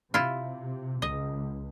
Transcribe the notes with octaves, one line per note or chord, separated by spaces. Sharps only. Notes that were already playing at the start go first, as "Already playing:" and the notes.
C3 E4 F4
C#2 D#5